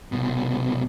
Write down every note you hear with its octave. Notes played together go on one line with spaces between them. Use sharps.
C2 B2